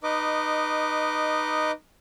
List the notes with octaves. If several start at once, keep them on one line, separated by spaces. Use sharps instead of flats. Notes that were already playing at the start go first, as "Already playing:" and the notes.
D#4 B4 D#5 D6